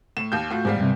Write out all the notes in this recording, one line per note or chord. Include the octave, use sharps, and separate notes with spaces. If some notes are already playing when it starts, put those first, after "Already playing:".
A2 E7
D#2 F5 G6
A2 F4 F#4
E2 G#2 G3 F5
G2 C3